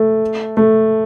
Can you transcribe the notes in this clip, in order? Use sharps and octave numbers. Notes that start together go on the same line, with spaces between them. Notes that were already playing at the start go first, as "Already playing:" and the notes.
Already playing: A3
A3